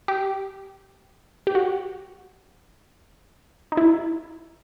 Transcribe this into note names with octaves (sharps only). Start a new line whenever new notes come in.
G4
G4
F#4
D#4
E4